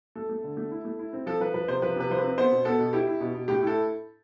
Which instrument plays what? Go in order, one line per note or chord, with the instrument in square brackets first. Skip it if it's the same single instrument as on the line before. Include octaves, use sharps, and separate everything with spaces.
[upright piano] A3 A4
A3
D3
A3
E4
A3
E4
C4
F3 A4
F3 B4
F3 B4
C3 C5
F3 B4
C3 B4
F3 C5
C4 B4
B3 C5
B2
B3 A4
B2
E4 G4
E4
B2
B2
A2 G4
E4 A4